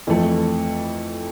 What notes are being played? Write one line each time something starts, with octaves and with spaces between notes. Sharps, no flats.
F2 E3 A3